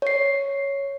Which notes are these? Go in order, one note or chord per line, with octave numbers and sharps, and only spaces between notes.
C#5 C7